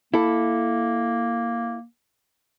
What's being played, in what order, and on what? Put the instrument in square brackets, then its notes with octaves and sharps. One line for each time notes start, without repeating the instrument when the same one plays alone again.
[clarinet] A#3 [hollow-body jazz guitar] E4 A4